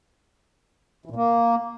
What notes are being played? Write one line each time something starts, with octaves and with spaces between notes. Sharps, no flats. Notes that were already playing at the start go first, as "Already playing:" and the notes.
E3
A#2
A#3